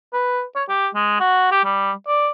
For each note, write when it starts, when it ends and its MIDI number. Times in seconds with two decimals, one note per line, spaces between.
0.14 0.43 71
0.56 0.64 73
0.69 0.88 67
0.95 1.18 56
1.20 1.51 66
1.51 1.64 67
1.65 1.92 55
2.07 2.30 74